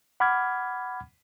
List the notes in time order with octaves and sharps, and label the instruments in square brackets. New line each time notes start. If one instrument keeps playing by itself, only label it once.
[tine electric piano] F#5 B5 D6 F6 G#6